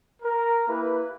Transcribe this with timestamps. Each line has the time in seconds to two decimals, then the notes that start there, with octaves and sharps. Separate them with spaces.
0.22 A#4
0.68 A#3 E4 G4 B4